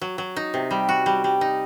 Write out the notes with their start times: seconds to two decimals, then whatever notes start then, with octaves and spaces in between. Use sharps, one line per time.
0.01 F#3
0.18 F#3
0.36 D#4
0.54 C3
0.71 G3
0.89 F#4
1.06 G3
1.24 G3
1.41 D#4